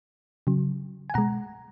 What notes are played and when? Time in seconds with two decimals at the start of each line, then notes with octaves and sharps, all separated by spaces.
0.47 C#3 F#3
1.10 G#5
1.14 B2 G#3 F#5 A#5